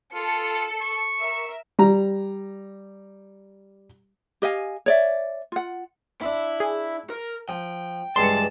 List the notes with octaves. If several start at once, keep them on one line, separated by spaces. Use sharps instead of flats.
F4 A4 C#7
C#6
A#4 E5
G3 A#5
G4 D#5 F5 G#5
C#5 D5 E5
F4 F#5
D4 E4 E5 C6
G#4
A#4
F3 G5
C#2 G2 E3 A5 C6 C7 C#7